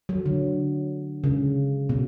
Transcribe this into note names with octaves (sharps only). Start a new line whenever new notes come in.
F#3
D3
C#3
B2